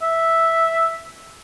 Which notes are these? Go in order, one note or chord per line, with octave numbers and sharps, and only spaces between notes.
E5